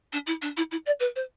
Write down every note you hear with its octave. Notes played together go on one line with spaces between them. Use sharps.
D4
E4
D4
E4
E4
D5
B4
C5